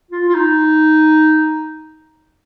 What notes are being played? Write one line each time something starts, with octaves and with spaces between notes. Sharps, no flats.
F4
F4
D#4